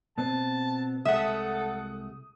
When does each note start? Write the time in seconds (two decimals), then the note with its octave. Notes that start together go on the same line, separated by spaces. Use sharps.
0.18 B2 B3 C4 A5
1.05 C2 G#3 A3 A4 E5 F#5 D#6